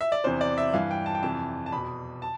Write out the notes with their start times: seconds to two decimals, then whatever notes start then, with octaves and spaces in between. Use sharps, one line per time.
0.01 E5
0.12 D5
0.24 E2 C3 E3 C5
0.41 D5
0.58 E5
0.74 G2 E3 F5
0.91 G5
1.06 A5
1.15 G5
1.23 F2 C3 E3 A5
1.66 A5
1.72 E2 B2 B5
2.22 A5